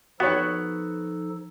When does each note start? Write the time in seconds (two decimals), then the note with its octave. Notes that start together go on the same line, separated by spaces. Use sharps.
0.20 F3 B3 D#4 F#4 A4 C#5